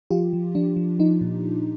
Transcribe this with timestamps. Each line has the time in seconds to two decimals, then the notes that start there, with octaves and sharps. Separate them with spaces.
0.10 F3 F4 G4
0.33 F3
0.55 F3 D4
0.76 F3
0.99 F3 D#4
1.21 A#2